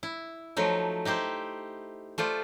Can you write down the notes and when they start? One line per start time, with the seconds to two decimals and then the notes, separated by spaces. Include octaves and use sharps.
0.03 E4
0.57 F3 F#3 A3 D#4
1.05 D#4 E4 G4 C5
2.18 A3 F4 C5 D5